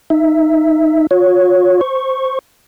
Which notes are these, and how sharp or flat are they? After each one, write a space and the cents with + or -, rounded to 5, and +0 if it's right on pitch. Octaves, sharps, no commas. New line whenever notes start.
D#4 +0 E5 +0
F4 +40 C#5 +0
C5 +0 C#6 -10